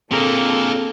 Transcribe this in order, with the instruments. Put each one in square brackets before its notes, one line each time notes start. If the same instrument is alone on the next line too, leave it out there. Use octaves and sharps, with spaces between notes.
[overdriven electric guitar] A#2 D3 [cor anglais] A#3 [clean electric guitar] C4 G#4 A#5 [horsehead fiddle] A4